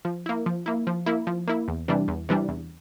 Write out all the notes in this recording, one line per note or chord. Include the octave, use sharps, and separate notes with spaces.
F3
A#3 E4
F3
A#3 E4
F3
A#3 E4
F3
A#3 E4
E2
C3 E3 G3 D4
E2
C3 E3 G3 D4
E2